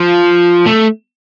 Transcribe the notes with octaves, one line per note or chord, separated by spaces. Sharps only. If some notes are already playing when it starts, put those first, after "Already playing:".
Already playing: F3
A3